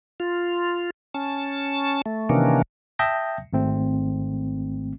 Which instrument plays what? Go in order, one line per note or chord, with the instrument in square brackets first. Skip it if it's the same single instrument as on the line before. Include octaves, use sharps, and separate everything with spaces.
[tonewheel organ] F4
C#4 A5
A3
C3 D#3 E3 A#3 C#4 D4
[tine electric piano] E5 G5 A5 D#6 G6 A#6
G#1 A3 C4